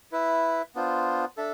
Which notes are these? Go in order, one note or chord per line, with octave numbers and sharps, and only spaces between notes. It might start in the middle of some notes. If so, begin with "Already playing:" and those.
E4 B4 E5
B3 D4 F4 C5
D4 A4 E5